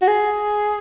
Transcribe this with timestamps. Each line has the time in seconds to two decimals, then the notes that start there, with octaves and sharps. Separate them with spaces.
0.02 F#4
0.08 G#4